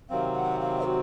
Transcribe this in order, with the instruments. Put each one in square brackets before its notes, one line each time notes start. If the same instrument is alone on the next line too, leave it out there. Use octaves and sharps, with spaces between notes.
[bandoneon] C3 D#3 F#3 C4 [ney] F5
[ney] F#5
F5
F#4